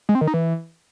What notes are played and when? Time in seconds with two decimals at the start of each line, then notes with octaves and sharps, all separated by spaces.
0.09 G#3
0.15 C4
0.21 D#3
0.27 D#4
0.34 E3